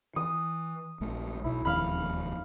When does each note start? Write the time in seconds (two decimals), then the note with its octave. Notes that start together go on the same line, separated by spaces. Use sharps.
0.16 E3 D#6
1.01 A#1 A#2 A3
1.44 B1 B2 E4
1.65 E1 D#2 F3 F5 B5